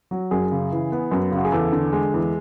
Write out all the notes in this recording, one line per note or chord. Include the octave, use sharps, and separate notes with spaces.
F#3
F#2 G#4
C#3
E3
B3
F#2
C#3
F#4
G#4
E2 A4
D3
G#3
E2